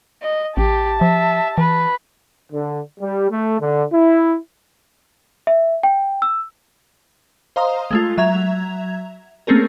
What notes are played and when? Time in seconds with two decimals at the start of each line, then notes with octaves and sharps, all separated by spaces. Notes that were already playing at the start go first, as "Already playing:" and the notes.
0.22 D#5
0.57 A1 G4 A5
1.01 F3 E5
1.58 E3 B4
2.53 D3
3.00 G3
3.31 A3
3.60 D3
3.93 E4
5.47 E5
5.83 G5
6.22 E6
7.56 C5 D#5 F5 A#5 C6 D#6
7.91 G#3 A3 F4
8.17 F#3 E5 A#5 G#6 F7
9.47 A3 A#3 C4 C#4 G#4 A#4